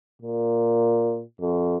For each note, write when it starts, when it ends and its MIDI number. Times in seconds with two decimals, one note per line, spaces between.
0.22 1.22 46
1.41 1.77 41